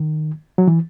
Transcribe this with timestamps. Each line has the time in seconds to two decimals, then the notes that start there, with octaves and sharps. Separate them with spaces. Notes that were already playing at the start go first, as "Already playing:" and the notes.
Already playing: D#3
0.58 F#3
0.67 E3